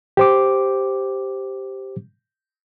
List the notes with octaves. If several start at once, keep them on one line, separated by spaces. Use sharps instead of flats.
G4 C5 D6